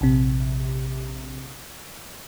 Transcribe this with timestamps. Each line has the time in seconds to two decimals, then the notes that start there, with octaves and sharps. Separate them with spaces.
0.01 A#1 C3